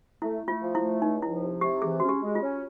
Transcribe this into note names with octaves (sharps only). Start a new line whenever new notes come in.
A3 E4
A3
F4
F3
E4
A3
C#2 D#4
F3 E4
C3
C3 G4
E3 G#4
C#4 F#4
G4
G#3
F4
C#4